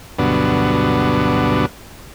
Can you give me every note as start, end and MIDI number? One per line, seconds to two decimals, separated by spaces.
0.19 1.66 38
0.19 1.66 43
0.19 1.66 47
0.19 1.66 54
0.19 1.66 59
0.19 1.66 62